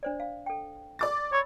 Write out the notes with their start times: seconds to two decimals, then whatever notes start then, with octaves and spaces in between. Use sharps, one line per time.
0.03 D4 C5 D5
0.20 F5
0.46 A4 G5
0.99 D5 D6 A6
1.32 C#5 B5 E6